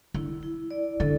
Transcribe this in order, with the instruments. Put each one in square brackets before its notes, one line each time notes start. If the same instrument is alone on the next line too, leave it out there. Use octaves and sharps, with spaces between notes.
[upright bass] D3 [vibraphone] E4
[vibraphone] E4
D5
[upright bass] D3 [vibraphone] A4